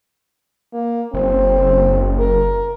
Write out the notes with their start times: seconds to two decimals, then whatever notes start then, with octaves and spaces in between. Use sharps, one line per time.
0.73 A#3
1.14 F#1 C4
2.19 A#4